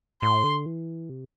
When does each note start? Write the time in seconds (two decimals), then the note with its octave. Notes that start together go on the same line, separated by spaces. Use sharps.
0.22 A2 C6
0.44 D3
0.66 E3
1.09 C3